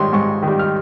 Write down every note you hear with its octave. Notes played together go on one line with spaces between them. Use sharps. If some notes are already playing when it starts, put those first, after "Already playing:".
Already playing: G#2 D#3 G3 C#5 C6
G#2 C#6
D#3
G3
F6